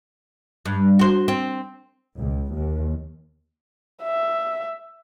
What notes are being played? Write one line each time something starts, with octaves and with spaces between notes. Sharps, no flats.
G2
F#4 C5
C4
C#2
D#2
E5